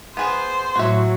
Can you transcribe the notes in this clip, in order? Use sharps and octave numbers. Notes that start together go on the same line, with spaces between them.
B3 G#4 B4 C5
A2 F#3 F#4 E5